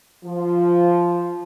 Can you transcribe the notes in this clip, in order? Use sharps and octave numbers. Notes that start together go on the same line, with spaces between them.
F3